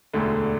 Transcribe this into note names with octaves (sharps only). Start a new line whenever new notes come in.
E1 D2 D3 A3